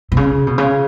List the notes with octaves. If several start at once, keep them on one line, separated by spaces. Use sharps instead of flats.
B2
C#3
B2
C#3